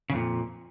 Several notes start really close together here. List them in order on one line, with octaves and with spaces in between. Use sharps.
C#3 F2 A#2